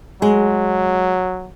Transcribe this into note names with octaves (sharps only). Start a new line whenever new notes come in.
F#3 G#3